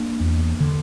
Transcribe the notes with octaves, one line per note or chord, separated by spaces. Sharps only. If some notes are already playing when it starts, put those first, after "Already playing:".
Already playing: A#3 D4
E2
D3